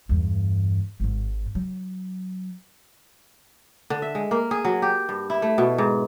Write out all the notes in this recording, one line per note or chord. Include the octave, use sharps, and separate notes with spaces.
E2 G2
G#1 G#2
F#3
D3
E5
G#3
A#3
G#4
F#3
G4
G2
E4
A3
B2
G#2